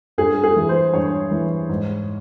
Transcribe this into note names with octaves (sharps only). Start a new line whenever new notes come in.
G2 G#4
G#4
E3
C5
G2 C#5
E3
G#2